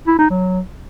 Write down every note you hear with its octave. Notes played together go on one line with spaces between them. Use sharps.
E4
D#4
F#3